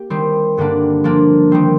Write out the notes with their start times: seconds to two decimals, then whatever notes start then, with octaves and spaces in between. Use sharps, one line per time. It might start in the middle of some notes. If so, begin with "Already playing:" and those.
Already playing: A#3 G4
0.10 D#3 G3 C4
0.57 G2 D3 G3 A#3 D4
1.04 F3 A#3 D4
1.52 D#3 G3 C4